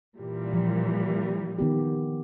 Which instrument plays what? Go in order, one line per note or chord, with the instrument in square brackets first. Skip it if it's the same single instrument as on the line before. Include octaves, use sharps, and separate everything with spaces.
[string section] A#2 E3 G3
[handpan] F3
D#3 B3 G4